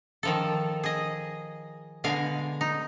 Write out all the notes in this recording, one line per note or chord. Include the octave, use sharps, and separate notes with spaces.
D#3 F3 A4
G#4 D#5
B2 D3 G#3 F5 G#5
D#4